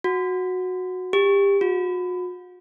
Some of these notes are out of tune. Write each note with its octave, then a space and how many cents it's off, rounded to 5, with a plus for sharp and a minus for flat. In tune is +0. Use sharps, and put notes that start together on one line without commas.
F#4 -10
G4 +25
F#4 -40